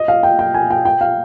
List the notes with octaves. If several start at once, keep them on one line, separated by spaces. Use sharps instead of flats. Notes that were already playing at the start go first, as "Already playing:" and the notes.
Already playing: D#5
F5
G5
G5
G#5
G5
G5
F5